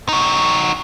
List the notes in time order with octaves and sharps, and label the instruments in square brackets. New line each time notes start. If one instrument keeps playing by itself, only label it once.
[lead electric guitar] D#4 F#4